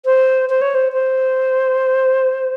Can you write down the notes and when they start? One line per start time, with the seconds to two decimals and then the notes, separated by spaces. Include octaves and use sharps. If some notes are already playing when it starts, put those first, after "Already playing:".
0.05 C5
0.50 C5
0.62 C#5
0.75 C5
0.92 C5